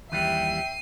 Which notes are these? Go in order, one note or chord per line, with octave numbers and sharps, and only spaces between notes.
D#2 E3 G3 E5 G5 C7 D#7